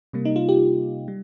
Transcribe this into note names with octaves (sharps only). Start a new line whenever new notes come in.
C3 G3 A#3
D#4
F4
G4
G3